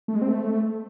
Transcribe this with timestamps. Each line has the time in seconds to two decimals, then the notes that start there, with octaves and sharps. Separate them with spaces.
0.08 A3
0.15 G#3
0.22 C4
0.28 A3